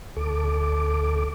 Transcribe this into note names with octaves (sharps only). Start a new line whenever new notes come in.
D2 A4 D6